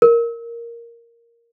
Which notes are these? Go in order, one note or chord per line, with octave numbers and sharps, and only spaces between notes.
A#4